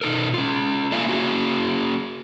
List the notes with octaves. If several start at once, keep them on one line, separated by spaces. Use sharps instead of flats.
B2 D#4 A4 A#4
C#4 F4
A3 A#3 D4 E5 F5 G#5
A#3 C#4 F#4 G#4